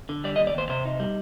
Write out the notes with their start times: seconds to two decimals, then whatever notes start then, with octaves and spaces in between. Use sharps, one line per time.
0.09 D3
0.24 G3 D5
0.36 D#5
0.40 D#2
0.47 D5
0.55 D#2 C5
0.69 C3 C5
0.85 D#4
1.00 G3